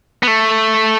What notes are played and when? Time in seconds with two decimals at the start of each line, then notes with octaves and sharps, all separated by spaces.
0.23 B3
0.27 A3